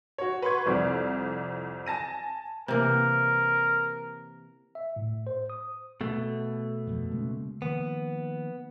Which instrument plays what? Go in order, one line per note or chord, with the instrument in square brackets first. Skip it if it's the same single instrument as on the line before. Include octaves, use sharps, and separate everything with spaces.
[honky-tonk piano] F#4 C#5
B4 F#5 C6 C#6 G#6
C2 F2 D5
G#5 A5 A#6 D#7
[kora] C3 E3 A#3 [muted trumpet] A#4
[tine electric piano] E5
A2
C5
D#6
[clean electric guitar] B2 A3
[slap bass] F2 C3
C#3 G#3 A#3
[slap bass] D#3 F3 A#3 [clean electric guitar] B3